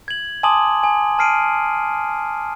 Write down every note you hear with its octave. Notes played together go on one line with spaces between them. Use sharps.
G#6 F#7
G#5 A5 C6 D6 D#6 F#7
G#5
A5 F6 C7 D7 D#7